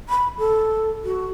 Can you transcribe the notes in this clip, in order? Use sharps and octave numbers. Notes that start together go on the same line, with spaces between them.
B5
A4
F#4